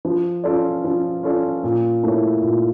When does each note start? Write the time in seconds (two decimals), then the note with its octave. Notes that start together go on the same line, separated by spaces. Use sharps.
0.05 F3
0.44 C#4 F4 A4 D5
0.84 F3
1.23 C#4 F4 A4 D5
1.64 A#2
2.03 A3 E4 A#4 C#5
2.43 A#2